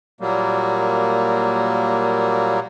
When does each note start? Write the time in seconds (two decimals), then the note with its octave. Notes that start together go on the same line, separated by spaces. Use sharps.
0.21 A#2 F#3 G3 A#3